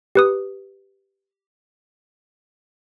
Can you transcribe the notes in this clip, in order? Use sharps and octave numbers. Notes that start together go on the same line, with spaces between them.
G4 B4 D#6